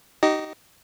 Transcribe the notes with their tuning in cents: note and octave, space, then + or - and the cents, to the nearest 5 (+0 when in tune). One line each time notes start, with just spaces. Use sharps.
D#4 +0 G4 -35 D#5 +0